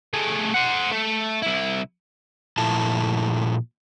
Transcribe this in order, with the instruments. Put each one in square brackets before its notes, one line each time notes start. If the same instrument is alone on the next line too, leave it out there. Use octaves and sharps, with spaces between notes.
[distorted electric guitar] A3 G#4
C5 F#5
A3
C2 E4
[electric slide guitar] A#2 F3 A3 E4 A5